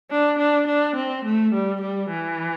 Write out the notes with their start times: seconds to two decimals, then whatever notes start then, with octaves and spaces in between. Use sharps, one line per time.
0.10 D4
0.39 D4
0.67 D4
0.96 C4
1.25 A3
1.53 G3
1.81 G3
2.10 E3